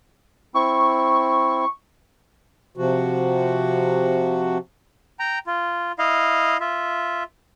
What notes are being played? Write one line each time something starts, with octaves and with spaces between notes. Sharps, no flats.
C4 E4 C#6
C3 F3 F#4
G5 A#5
F4
E4 D#5 F5
F4 E5